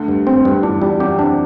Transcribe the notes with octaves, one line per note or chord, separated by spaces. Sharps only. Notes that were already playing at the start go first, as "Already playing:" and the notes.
Already playing: D2 D3
G2
C4
G2
E2 E3 D4
E2 E3 G3
F#2 F#3 G4
C3 C4 D4